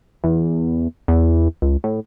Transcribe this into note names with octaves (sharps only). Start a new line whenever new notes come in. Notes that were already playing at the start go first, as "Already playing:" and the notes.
E2
E2
C#2
A2